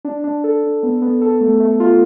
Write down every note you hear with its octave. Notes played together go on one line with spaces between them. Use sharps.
D4
D4
A4
D4
B3
B3
A4
A3
A3
F4